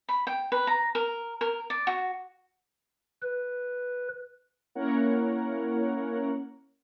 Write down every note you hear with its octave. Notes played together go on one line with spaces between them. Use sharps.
B5
G5
B4
A#5
A#4
A#4
D5
F#4
B4
A#3 C#4 E4 A#4 C#5 F#5